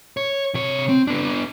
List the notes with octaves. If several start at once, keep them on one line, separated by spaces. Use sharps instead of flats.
C#5
C3 C#5
C4
B3 D4